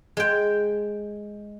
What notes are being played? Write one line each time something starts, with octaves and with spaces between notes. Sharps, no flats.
G#3 G5